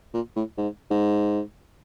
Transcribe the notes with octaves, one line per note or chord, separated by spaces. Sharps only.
A#2
A2
G#2
G#2